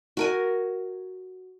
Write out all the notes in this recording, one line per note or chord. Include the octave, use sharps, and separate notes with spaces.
F#4 A#4 G#5